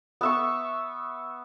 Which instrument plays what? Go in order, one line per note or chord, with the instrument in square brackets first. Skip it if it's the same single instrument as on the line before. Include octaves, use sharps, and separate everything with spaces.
[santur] B3 E5 C#6